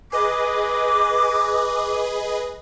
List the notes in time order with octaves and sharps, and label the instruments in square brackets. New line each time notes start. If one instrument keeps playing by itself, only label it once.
[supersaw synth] G#4 B4 D#5 [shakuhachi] D6